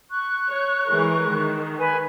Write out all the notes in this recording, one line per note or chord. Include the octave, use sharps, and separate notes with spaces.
C#6 F#6
C#5
E3 G#3 A#4
D#3
B4 G#5